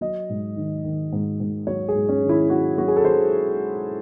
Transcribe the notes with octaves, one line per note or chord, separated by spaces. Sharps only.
F#3 D#5
G#2
D#3
D#3
G#2
G#2
F#3 C#5
G#4
G#2
C#4
D#3
E4
F#3 F#4
F#3 F#4
G#4
A4
F#3 C5